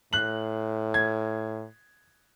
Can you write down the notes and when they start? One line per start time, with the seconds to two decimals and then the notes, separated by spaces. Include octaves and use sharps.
0.13 A2 F#6 F#7
0.94 G#6